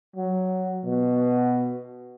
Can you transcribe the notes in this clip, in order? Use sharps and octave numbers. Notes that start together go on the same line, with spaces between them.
F#3
B2